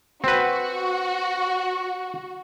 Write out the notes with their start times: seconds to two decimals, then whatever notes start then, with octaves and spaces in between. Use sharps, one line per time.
0.24 C4 F#4 B4